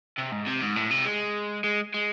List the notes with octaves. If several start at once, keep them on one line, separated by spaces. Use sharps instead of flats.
C3
G#2
C3
G#2
A2
C3
G#3
G#3
G#3